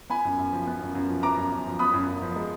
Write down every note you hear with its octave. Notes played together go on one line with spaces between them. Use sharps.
B3 G#5 B5
F#2
F#2
F3
B3
F#2
F#2
F3
B3 A#5 D6
F#2
F#2
F3
B3 B5 D#6
F#2
F#2
F3
G#3